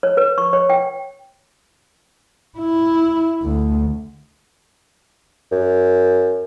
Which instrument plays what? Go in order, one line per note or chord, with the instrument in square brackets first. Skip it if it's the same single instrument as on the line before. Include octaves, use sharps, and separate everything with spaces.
[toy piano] C#5
B4
C#6
C#5
G5
[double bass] E4
D2
[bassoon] F#2